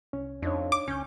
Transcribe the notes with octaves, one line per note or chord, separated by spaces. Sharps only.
C2 C#4
F2 D4 D#4 C#5
D6
C#2 C#4 G6